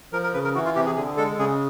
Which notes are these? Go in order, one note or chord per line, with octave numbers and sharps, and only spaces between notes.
F3 A#4
A#4
C#3 B4
A#4
E3 F#4
F4
C3 G4
G#4
D3 G#4
G#3 A4
C#3 G#4